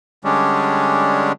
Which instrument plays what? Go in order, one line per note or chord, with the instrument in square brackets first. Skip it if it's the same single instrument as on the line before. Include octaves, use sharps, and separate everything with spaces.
[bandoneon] D3 G3 G#3 C#4 D4